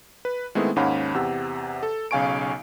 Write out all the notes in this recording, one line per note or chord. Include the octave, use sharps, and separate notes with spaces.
B4
D#3 G#3 A3 B3 C4 E4
D#2 G#2 C#4 F5 F#5 B5
E2 C3 G4 F#5 E6
A4
B1 C#3 F5 G#5 C#6 D7